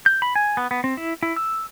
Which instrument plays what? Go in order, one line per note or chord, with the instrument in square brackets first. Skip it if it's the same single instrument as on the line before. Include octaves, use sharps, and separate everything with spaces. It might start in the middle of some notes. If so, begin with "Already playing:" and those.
[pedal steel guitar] G6
B5
G#5
B3
B3
C4
E4
E4
E6